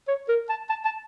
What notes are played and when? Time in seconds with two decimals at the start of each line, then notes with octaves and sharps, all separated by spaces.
0.08 C#5
0.28 A#4
0.49 A5
0.70 A5
0.85 A5